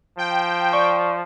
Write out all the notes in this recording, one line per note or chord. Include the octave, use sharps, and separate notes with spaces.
F3 G5
D5 C#6